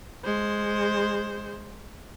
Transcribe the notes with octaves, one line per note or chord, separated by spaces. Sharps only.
G#3 C5